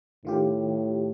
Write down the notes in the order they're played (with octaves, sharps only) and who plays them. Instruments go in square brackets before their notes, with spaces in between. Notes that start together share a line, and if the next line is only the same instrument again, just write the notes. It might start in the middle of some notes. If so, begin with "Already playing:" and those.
[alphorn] A2 [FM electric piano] D#3 F4 G4